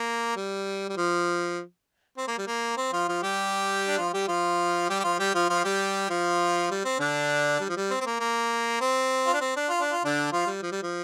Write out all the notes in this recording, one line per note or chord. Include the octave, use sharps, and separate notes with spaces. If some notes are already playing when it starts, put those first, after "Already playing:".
Already playing: A#3
G3
G3
F3
C4
A#3
G3
A#3
C4
F3 F4
F3 F4
G3 G4
D4
F3 F4
G3 G4
F3 F4
G3 G4
G4
F3 F4
G3 G4
F3 F4
F3 F4
G3 G4
F3 F4
G3
C4
D3 D4
G3
F3
G3
C4
C4
A#3
A#3
C4
F4
D4
C4
D4
F4
D4
F4
D3 D4
F3 F4
G3
F3
G3
F3